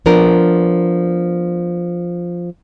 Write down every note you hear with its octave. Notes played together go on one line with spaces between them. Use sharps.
F3 B3 D4 A#4